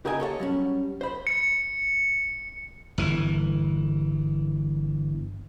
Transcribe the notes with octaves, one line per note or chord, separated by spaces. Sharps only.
C#3 G4 A#4 D#5 G#5
A4 C#5 E5 A5
F#3 G3 C#4
C5 B5
C#7
G1 E3